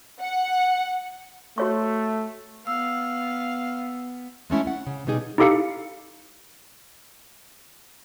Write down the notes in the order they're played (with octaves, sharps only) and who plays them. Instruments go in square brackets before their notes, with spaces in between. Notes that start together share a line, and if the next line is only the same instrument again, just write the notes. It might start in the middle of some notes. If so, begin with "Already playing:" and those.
[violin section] F#5
[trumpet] A3 [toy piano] F#4 C#5 C#6
[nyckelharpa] B3 [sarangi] F5 [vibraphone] E6
[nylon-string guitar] G#3 A3 C#4 E4
F#5
C#3
B2 G3 D#4 G#4
[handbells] D#4 E4 G4 A4 F5 C#7